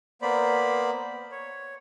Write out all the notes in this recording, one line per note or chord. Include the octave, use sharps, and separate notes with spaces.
A#3 B3 C5 D5 B5
C#5